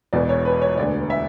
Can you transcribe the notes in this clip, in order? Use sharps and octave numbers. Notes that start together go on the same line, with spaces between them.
E1 E2 B2 D5
C#5
B4
C#5
E1 D2 D3 D5
E5